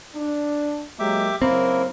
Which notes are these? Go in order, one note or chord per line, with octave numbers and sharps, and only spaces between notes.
D4
F#3 G#3 A#3 G4 E5 D6
F#1 F#2 A#3 C4 E4 A#4